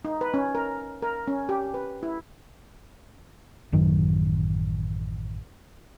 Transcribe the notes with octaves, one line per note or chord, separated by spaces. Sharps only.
D#4
B4
C#4
A#4
A#4
C#4
G4
B4
E4
A1 F#2 D#3 F#3